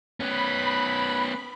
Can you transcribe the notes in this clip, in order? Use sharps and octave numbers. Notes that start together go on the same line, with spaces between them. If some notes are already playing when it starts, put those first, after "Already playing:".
B3 C#4 B5